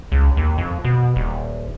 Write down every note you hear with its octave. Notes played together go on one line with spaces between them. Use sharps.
C#2
D#2
F2
B2
D#1